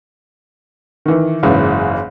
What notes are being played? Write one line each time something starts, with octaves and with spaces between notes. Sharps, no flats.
D#3 E3
F#1 G#2 C#3 E3